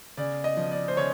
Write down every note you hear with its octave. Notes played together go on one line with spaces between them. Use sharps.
C#3 D5
D#5
F3
D5
C5
C#3 C#5